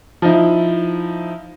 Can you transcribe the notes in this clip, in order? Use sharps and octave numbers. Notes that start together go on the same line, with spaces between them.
F3 D#4 E4